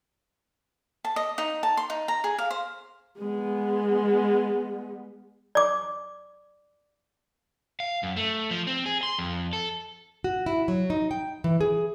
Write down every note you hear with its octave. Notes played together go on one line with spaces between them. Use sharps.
A5
D#5
D#4
A5
C6
D#4
A#5
G#4
F5
C5
G#3 B3
D5 D6
F5
F#2
A3
F3
C4
G#4
C6
F2
A4
F#4
E4
F#3
D#4
G5
E3
G#4